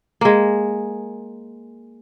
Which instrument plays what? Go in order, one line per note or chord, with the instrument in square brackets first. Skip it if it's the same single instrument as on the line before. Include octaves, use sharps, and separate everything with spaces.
[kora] G#3 A#3